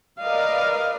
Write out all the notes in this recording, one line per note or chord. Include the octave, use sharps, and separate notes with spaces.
A#4 B4 D5 D#5 F5